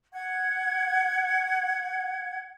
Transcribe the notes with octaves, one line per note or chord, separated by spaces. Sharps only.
F#5 G#6